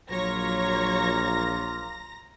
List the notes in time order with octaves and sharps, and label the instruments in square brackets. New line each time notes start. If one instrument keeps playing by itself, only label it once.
[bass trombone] A#1 [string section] F#3 C#5 [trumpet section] A#3 F4 [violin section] A#5 A#6